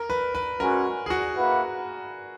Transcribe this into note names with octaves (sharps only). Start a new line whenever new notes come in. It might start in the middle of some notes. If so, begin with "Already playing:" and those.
Already playing: A#4
B4
B4
G#3 C#4 F#4 A#4
G#4
F#4
A#3 E4 B4 F#5